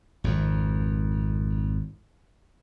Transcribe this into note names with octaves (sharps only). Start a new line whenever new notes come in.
G#1 F2